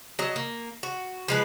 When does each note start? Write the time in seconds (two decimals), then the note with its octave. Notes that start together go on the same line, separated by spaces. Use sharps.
0.19 F#3 D#5
0.36 A#3
0.83 F#4
1.28 F3 G#3 B4